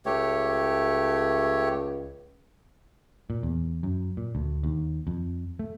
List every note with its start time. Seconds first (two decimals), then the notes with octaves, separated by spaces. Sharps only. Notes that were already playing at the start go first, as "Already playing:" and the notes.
0.06 C#2 A3 G4 C#5
3.30 A#2
3.43 E2
3.83 F#2
4.17 A#2
4.35 D2
4.63 D#2
5.07 F2
5.59 A3